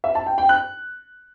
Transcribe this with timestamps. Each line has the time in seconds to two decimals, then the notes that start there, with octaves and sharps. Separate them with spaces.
0.04 E5
0.15 A5
0.27 G5
0.38 G5
0.49 F#6